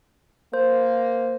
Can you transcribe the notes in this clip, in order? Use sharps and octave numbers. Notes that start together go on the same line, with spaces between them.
A#3 C5